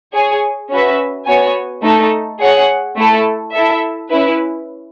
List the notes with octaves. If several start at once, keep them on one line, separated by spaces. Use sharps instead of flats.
G#4 C#5 G#5
C#4 F#4 B4 E5
B3 F#4 C#5 G#5
A3 D#4 A4
G#4 C#5 F#5
A3 E4 A4
E4 A4 E5
C#4 E4 B4